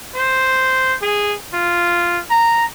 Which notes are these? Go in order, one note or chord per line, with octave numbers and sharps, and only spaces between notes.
C5
G#4
F4
A#5